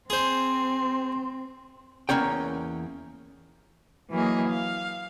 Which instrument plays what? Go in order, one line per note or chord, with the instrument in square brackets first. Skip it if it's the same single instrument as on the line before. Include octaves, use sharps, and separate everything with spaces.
[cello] C4 [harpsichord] G#4 C5 [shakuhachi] C6
[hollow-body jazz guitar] E2 G#3 A#3 C#4 C#5 G5
[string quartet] E3 F#3 A#3 G#4 D#5
F5